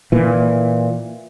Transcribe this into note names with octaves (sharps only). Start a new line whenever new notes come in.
A#2 E3